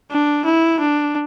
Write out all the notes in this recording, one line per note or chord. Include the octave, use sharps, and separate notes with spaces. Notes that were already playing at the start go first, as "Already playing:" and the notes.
D4
E4
D4